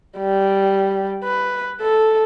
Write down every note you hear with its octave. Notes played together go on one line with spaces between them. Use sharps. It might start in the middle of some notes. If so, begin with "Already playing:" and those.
G3
B4
A4